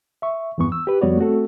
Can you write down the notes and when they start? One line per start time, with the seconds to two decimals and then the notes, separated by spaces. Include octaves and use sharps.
0.22 E5 C#6
0.58 E2 G2 E3 B3 C#6
0.72 E6
0.87 G4 B4
1.01 F2 G3 B3 F#4 C#5 D5
1.18 A3 C4 F#4 A4